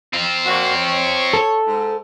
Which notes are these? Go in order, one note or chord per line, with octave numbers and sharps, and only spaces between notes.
C4 F4
A#3 D4 F#4
C#5
A4
G#2